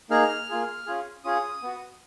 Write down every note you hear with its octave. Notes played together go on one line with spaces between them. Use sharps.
A#3 D#4 G#4 F6
A#3 F4 G#4
C#4 F4 G#4
C#4 F4 G#4 D#6
B3 F#4